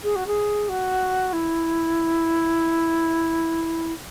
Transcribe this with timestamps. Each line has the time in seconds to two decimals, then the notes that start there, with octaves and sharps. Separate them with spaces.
0.04 G#4
0.16 F#4
0.27 G#4
0.69 F#4
1.33 E4